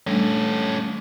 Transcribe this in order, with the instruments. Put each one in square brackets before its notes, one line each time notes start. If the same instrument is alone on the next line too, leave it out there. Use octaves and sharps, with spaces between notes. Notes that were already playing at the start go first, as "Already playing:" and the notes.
[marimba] G3 A3 D4 [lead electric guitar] C#4 A4